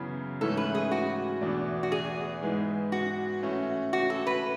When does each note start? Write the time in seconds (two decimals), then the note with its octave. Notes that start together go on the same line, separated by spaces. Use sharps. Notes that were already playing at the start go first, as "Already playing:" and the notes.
Already playing: F#2 C#3 E3 B3
0.41 G#2 E3 A3 C#4 E4 A4
0.57 B4
0.75 G#4
0.91 F#4
1.41 E2 B2 A3 D4
1.83 F#4
1.92 G#4
2.42 G#2 E3 G#3 B3
2.92 F#4
3.43 A2 E3 A3 C#4
3.93 F#4
4.10 A4
4.27 B4